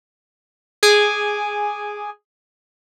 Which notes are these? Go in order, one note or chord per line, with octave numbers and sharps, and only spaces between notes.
G#4 G#5 D6